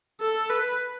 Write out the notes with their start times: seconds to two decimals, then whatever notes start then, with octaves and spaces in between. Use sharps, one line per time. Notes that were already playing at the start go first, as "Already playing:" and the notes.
0.21 A4
0.50 B4